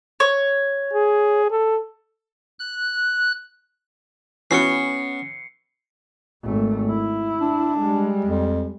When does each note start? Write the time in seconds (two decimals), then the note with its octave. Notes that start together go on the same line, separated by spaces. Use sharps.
0.20 C#5
0.94 G#4
1.51 A4
2.59 F#6
4.51 E3 B3 C#4 F#4 C7 C#7
6.43 G#1 A3
6.89 E4
7.41 D4
7.78 G3 G#3
8.25 F2